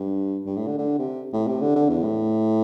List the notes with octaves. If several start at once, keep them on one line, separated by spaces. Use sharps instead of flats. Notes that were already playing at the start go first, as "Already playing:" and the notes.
Already playing: G2
G2
A2
D3
D3
C3
A2
C3
D3
D3
E2
A2